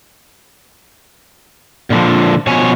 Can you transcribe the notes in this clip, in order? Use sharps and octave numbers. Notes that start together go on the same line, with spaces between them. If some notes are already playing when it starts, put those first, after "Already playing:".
A#2 D3 F3
B2 F3 C#5 G#5